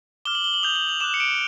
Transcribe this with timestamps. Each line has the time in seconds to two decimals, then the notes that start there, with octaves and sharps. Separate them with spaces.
0.25 D6 F6 G7
0.35 F#7
0.44 G7
0.54 F#7
0.63 D#6 G6 F7
0.76 F#7
0.89 F7
1.00 D6 F#6 E7
1.14 C#7
1.20 D7